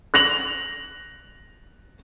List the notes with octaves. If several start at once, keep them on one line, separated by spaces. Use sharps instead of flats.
F#6 A#6 F7 F#7